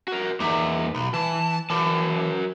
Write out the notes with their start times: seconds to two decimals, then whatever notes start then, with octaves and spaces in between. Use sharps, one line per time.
0.08 F#4 A#4
0.40 E2 A#3 D#4 E5
0.95 B1
1.14 E3 A5
1.70 E3 F#3 A#4 A5